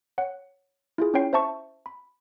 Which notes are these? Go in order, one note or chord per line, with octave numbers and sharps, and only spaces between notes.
C#5 F#5
E4 F4 G#4
C#4 E4 C#5 G5 C7
C5 E5 A5 C#6
B5